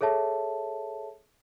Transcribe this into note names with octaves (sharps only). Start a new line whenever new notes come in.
G#4 A4 C#5 E5 A5